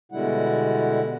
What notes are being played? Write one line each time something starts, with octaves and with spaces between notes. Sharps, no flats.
B2 D3 G3 G#3 E4 F#5